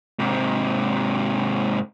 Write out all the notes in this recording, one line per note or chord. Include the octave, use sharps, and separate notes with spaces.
G#2 C3